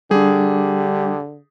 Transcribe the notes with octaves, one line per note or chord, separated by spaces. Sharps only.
D3 G3 D4 G4 G#4